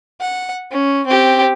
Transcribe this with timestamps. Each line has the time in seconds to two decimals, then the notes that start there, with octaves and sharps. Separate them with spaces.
0.20 F#5
0.71 C#4
1.06 C4 G4